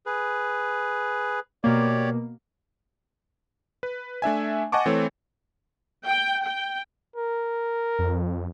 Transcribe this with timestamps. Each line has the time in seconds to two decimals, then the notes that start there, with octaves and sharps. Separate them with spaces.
0.06 G#4 B4
1.64 B2 A#3 G4 C#5 D5
3.83 B4
4.22 A3 D4 E5 G#5
4.72 D#5 F#5 G#5 A5 C#6 D6
4.86 E3 A3 C4 A4 C#5
6.06 G5
6.46 G5
7.16 A#4
7.99 F2